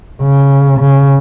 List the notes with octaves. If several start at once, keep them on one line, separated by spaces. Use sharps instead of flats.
C#3
C#3